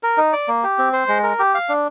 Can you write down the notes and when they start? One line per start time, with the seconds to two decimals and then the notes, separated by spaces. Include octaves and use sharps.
0.03 A#4
0.17 D#4
0.33 D5
0.48 A#3
0.64 G4
0.78 C4
0.93 C5
1.08 G#3
1.23 A#4
1.39 G4
1.54 F5
1.69 D4